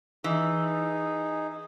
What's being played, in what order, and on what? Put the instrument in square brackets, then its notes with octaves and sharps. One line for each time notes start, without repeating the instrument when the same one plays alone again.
[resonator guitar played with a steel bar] E3 [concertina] D#4 G#4